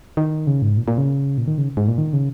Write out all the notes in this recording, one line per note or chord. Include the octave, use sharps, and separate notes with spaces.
D#3
C#3
G#2
A#2
A#2
C#3
A#2
D#3
C#3
G#2
A#2
D#3
C#3